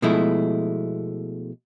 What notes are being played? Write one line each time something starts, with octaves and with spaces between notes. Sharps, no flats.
B2 F3 G#3 A3 E4